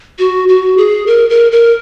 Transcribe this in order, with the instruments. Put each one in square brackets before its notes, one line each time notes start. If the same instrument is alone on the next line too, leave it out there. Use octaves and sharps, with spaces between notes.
[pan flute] F#4
F#4
G#4
A#4
A#4
A#4